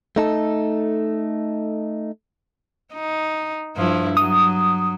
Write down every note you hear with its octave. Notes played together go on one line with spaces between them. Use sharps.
A3 D#4 A4
D#4
G2 F3 E4
F#3 D#6